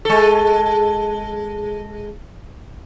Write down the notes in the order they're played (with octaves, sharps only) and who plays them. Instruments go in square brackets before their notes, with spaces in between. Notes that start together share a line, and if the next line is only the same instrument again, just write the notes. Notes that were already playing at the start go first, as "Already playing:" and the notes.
[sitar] G#3 A4